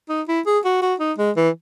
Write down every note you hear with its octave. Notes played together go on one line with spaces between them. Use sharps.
D#4
E4
G#4
F#4
F#4
D#4
G#3
E3